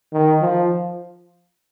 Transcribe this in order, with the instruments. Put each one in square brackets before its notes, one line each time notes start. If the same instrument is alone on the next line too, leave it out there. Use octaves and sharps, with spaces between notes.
[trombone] D#3
F3